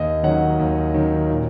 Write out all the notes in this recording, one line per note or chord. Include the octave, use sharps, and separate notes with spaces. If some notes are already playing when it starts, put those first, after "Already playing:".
Already playing: D#2 D#5
D#3 F#3 C#4 F#5
D#2
D#3 F#3 C#4
A#2